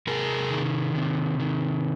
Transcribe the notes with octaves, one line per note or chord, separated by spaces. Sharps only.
C3 G#4 A#4
D#3
C3
D#3